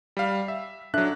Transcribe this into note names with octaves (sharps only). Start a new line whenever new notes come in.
G3 F5
E5
F#3 D4 A4 E5 F#6